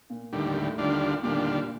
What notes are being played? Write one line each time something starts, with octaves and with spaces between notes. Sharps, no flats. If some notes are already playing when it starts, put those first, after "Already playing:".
A#2
D#2 A2 D3 G3
A2
D#2 D3 G3 D4 F4
D#2 A#2 D3 G3 D4 F4